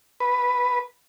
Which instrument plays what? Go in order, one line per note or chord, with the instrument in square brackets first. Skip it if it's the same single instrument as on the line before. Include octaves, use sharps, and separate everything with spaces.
[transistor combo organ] B4